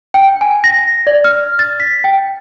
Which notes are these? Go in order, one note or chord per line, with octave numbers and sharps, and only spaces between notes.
G5
G#5
A#6
D5
F6
A6
B6
G5